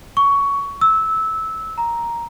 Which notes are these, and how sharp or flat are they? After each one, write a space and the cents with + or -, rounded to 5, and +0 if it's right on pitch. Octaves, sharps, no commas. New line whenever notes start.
C#6 +15
E6 -15
A#5 +5